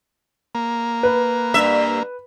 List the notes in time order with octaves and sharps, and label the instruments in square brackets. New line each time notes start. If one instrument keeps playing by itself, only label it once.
[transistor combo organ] A#3
[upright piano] B4
[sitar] G2 E5